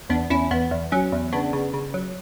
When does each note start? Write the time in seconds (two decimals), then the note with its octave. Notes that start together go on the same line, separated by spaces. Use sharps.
0.10 E2 B3 D4
0.30 E2 C#4 E4
0.51 E2 B3
0.71 E2
0.92 F#3 C#4
1.12 E2
1.32 C#3 B3 D4
1.53 C#3
1.74 C#3
1.94 F#3